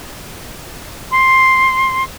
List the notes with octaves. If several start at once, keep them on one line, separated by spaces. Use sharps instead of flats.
C6